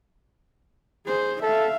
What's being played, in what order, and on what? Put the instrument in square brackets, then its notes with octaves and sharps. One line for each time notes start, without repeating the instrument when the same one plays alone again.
[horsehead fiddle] G#4 C5
[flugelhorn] A4 [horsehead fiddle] E5 F5